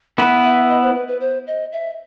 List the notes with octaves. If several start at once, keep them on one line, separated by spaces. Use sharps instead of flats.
B3 E4 B4 F#5
E5
D#5
C5
B4
B4
C5
D#5
E5